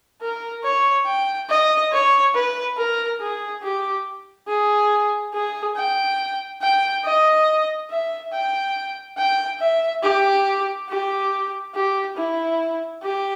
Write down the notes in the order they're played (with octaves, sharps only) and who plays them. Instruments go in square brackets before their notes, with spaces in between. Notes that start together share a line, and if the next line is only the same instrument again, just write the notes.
[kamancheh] A#4
C#5
G5
D#5
C#5
B4
A#4
G#4
G4
G#4
G#4
G5
G5
D#5
E5
G5
G5
E5
G4
G4
G4
E4
G4